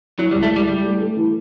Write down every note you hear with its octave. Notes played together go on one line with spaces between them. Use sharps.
F#3 E4
G3
C#2
A3
G3 E4
G3 E4
A3
A3
E3